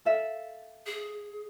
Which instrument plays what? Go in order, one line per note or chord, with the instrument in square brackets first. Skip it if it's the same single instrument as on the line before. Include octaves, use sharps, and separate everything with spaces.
[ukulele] A4 E5 F5
[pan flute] G#4